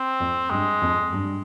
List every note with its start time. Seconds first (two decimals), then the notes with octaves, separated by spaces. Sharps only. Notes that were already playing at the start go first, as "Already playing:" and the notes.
Already playing: C4
0.20 F2
0.50 G2 G#3
0.81 F2
1.13 G2